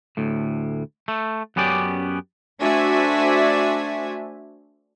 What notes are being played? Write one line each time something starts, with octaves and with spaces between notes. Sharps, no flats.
D2 A2
A3
F#2 B3 C#4 G4 D5
A3 D4 F#4 C5 E5 G#5